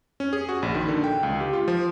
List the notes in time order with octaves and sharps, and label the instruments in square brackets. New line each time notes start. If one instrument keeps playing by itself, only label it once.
[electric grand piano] C#4
G#4
F#4
A#1
D#3
D3
G5
C#2
G4
F4
F3